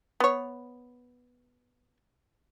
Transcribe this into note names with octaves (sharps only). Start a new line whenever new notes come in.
B3 C#5